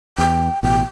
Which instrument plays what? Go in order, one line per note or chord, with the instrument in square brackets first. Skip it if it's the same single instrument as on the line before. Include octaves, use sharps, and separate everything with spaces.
[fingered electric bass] E2 [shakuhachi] G5
[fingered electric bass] A1 B2 [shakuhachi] G5